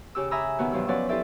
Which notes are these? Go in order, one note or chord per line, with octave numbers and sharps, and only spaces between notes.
C#3 G4 D6 E6
E5 G#5 A#5 B5 D#6 E6
B2 D#3 B3 F#4 G4
G2 B2 F3 F#3 G4 E6
F3 F#3 B3 C#4 B4 D5
E4 F4 G4 A4 D5 E5